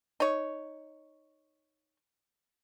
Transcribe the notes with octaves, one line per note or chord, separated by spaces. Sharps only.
D#4 C#5